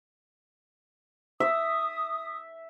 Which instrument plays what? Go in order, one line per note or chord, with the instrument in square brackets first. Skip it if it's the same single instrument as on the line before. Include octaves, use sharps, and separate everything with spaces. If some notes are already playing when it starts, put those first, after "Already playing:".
[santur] E5 [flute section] D#6